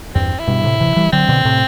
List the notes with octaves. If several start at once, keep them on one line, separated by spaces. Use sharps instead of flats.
E2 G2 C4
E4
G2 B2
A2 C3
C3 E3
E3 G3
D3 F#3 C4
B2 D3
A2 C3